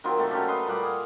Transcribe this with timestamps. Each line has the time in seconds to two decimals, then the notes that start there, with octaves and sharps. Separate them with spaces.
0.04 D#3 F#3 C4 F4
0.18 C3 A3 A#3 A4
0.31 F#3 C#4 G4
0.48 B4 D#5 C6
0.67 A#2 G3 F#5 D6
0.83 G#4 F5